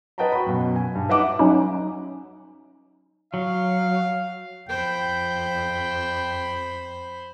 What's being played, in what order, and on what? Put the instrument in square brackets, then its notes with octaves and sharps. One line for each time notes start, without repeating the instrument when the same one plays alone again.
[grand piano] B4 D#5 F#5 G5 A5 A#5
F#4 B5
F#2 B2
G#5
G2
D#4 B4 D#5 E5 F#5 D6
[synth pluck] F#3 C#4 D#4
[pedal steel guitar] F#3 [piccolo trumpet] F5
[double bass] F2 [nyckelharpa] C5 B5 [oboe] G5